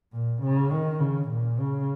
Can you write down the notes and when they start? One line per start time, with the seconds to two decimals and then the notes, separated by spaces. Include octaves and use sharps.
0.13 A#2
0.42 C#3
0.71 D#3
1.00 C#3
1.29 A#2
1.59 C#3